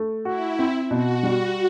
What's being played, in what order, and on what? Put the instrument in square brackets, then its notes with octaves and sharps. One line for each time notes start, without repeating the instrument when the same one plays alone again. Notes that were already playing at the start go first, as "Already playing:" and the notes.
Already playing: [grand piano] A3
[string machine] E4 [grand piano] F#4
[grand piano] C4
[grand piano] B2 [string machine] F#4
[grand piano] G3